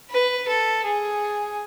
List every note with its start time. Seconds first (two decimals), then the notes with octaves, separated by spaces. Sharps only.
0.10 B4
0.48 A4
0.85 G#4